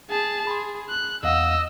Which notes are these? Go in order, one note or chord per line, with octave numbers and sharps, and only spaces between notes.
G#4 A5
G#4 B5 C6
F#6
E2 D#5 F5 F#5 E6